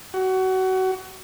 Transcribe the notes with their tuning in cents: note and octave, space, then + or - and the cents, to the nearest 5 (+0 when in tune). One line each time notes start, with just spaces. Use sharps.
F#4 +25